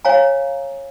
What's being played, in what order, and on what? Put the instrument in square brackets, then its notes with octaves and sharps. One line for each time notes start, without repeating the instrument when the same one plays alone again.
[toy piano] C#5 F5 G#5 A#5